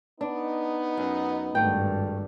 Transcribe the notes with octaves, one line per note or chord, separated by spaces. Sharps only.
B3 D4 D#4
F#2
G#1 G2 A3 G5